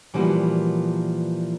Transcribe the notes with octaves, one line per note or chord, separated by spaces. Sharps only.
A#2 E3 F3 G3 B3 F#4